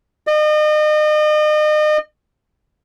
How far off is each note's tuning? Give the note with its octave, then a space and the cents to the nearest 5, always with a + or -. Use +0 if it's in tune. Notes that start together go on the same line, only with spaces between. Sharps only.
D#5 -35